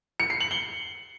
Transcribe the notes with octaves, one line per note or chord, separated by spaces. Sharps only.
C#7
C7
F#7
G7